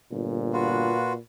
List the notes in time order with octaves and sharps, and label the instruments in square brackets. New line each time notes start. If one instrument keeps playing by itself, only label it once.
[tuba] G1 [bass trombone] A#2
[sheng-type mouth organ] F4 F#4 B4